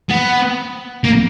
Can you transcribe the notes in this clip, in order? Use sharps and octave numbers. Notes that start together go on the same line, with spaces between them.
B3
A#3